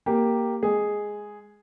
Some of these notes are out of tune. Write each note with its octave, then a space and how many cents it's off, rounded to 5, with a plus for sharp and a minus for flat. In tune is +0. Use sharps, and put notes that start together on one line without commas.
A#3 +0 G4 +0
G#3 +0 G#4 +0